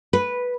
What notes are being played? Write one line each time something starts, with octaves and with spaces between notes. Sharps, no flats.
B4